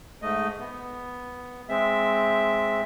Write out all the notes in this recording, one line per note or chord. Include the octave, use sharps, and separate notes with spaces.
G#2 A3 D#5
B3
G#3 C4 E5